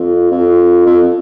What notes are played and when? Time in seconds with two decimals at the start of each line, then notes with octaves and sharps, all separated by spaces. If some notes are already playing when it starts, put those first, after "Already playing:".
Already playing: F2
0.31 F2
0.86 F2